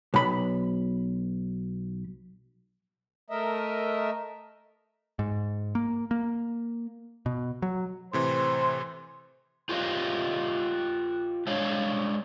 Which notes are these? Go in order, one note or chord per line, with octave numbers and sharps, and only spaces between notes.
B1 B5
A3 A#4 D#5 E5
G#2
A#3
A#3
B2
F#3
A2 C3 E3 C5 C6
F4 G4 B4 D#5 F5
G#3 D4 C#5 F5